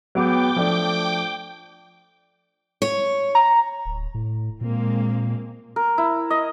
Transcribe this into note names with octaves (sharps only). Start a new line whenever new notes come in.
F#3 G#3 B3 G5 D6
F3 A3 D4
C#5
A#5
D1
A2
A#2 G#3 A#3 C4
A#4
E4
D#5